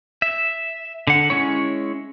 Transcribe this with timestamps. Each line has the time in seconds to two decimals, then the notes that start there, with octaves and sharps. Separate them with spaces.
0.22 E5
1.07 D3 F#5
1.30 G#3 C#4 E4 C#5